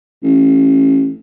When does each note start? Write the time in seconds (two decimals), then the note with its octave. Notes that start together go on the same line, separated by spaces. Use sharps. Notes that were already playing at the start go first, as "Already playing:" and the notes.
0.23 A1